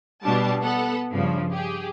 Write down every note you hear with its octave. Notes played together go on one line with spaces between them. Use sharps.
B2 G3 D4 A5
B3 A4 F#5
G2 C#3 F3
G4 G#4